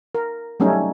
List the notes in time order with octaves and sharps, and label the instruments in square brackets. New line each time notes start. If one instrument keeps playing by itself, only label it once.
[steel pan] A#4
F#3 G3 A3 C#4 D#4